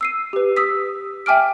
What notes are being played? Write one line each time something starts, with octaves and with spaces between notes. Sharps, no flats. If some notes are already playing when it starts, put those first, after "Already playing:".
E6 C7 D#7
G4 B4
D#6 E6 B6
E5 G5 G#5 D6 F6 D7